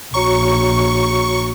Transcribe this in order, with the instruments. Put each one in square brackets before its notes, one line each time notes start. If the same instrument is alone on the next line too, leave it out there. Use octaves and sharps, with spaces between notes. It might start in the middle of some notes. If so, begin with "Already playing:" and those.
[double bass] A#1 [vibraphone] F#4 C#5 A#5 [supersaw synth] C#6